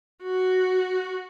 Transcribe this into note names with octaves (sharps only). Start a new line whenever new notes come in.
F#4